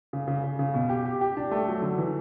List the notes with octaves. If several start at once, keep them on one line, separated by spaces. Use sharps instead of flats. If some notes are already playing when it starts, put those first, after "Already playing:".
C#3
C#3
C#3
C#3
B2
G4
G4
G4
D4
A3
F#3
D3
E3